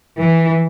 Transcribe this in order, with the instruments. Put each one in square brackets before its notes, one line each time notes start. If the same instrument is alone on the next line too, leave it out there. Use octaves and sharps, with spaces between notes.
[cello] E3